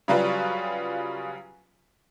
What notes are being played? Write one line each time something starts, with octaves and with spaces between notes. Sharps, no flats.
C#3 F#3 G3 F4 F#4 B4